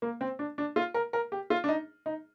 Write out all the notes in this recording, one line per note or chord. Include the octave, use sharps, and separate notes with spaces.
A#3
C4
D4
D4
F4
A#4
A#4
G4
F4
D4
D#4
D#4